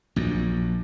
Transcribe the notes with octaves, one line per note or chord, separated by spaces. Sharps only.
A#1 F#2